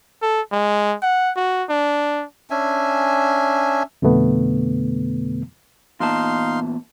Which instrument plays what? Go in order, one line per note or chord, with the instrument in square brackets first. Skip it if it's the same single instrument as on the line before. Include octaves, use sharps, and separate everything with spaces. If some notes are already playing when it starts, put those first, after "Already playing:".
[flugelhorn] A4
G#3
F#5
F#4
D4
[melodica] C#4 D4 E5 G#5
[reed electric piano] F2 B2 D3 A3 B3
[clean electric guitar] E2 A#2 A5 [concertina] D#4 F5 C6